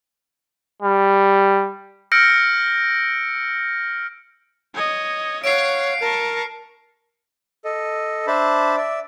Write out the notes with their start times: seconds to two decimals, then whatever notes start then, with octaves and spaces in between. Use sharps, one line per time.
0.82 G3
2.12 E6 F6 G6 A#6 C#7 D7
4.75 C#5 D#5
5.44 C#5 F5 F#5 C7 D7
6.01 A#4 A5 C#6
7.65 A4 D#5
8.27 D4 C5 E5 A5 B5
8.77 D5 E5